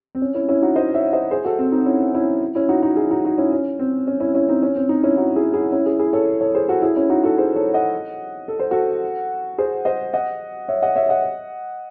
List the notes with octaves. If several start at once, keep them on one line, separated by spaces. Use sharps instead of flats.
C4
C#4
C#4 E4
C#4 E4
D#4 F#4
C5 D#5
C#5 E5
C5 D#5
G#4 C5
F#4 A4
C4
C4 D#4
C#4 E4
C#4 E4
C#4 E4
D#4 F#4
D#4 F#4
E4 G#4
D#4 F#4
D#4 F#4
C#4 E4
C#4
C4
C#4
C#4 E4
C#4 E4
C4 D#4
C#4
C4
C4 D#4
C#4 E4
D#4 F#4
E4 G#4
E4 G#4
C#4 E4
E4 G#4
E4 G#4
A4 C#5
A4 C#5
G#4 C5
F#4 A4
E4 G#4
C#4 E4
D#4 F#4
F#4 A4
G#4 C5
A4 C#5
D#5 F#5
A4
C5
F#4 A4
G#4 C5
C5 D#5
D#5 F#5
C#5 E5
D#5 F#5
C#5 E5
D#5 F#5